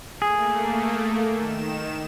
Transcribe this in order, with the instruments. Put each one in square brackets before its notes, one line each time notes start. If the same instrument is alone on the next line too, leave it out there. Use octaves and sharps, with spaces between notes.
[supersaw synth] A3 A#3 [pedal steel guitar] G#4
[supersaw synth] D#3 E7